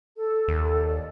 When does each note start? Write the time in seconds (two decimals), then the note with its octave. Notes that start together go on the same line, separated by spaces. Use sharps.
0.17 A4
0.48 D#2
0.87 D5